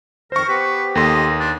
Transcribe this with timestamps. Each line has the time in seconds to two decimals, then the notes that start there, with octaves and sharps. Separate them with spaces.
0.32 F2 D#3 A#4 C5 C#6
0.49 B3 G4 B4
0.95 D#2 A4 D#5 C6
1.39 D4